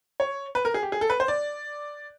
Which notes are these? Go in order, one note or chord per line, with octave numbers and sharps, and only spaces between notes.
C#5
B4
A#4
G#4
G4
G#4
A4
B4
C5
D5